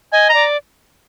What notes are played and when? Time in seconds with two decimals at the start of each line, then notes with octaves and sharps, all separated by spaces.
0.12 D#5 G#5
0.29 D5 A#5